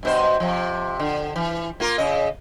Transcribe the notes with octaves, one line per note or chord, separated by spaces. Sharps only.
G2 B2 C5
C3 F3
D3
E3
A#3 F4 A#4
C#3 D#5